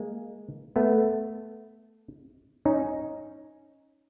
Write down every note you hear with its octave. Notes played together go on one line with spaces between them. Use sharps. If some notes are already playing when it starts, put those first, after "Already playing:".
Already playing: G#3 A#3
A3 B3
C#4 D#4